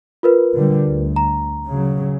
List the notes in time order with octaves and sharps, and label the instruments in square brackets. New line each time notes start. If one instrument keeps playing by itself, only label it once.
[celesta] F4 A#4 B4
[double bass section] D3 G3
D2
[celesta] A#5
[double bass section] C#3 F#3